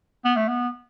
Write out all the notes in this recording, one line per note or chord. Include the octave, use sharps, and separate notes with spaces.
B3
A3
B3